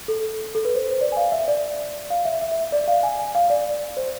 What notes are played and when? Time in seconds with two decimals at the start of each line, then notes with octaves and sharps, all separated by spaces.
0.08 A4
0.55 A4
0.65 B4
0.75 C5
0.90 C5
1.01 D5
1.12 G#5
1.17 F5
1.32 E5
1.48 D5
2.10 F5
2.25 E5
2.41 E5
2.52 E5
2.72 D5
2.88 F5
3.03 G#5
3.19 G#5
3.35 F5
3.50 D5
3.97 C5